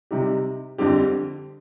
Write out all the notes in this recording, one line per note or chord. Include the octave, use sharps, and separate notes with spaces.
C3 G3 C4 D#4 G4
F2 D3 G3 C4 G4